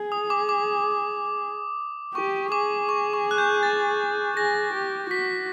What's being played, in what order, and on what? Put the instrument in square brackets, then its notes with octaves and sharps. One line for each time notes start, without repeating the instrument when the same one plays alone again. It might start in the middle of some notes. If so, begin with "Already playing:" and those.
Already playing: [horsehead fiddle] G#4
[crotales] D#6
D6
D6
[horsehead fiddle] G4 [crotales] C#6
[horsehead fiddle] G#4 [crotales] D6
[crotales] C#6
C#6
F#6
G6
A6
[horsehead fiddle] G#4 [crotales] A#6
[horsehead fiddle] G4
[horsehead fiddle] F#4 [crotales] B6